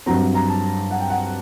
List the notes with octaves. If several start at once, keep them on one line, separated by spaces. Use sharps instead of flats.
G2 F#3 C4 A#5
A#5
A5
F#5
G5
F#5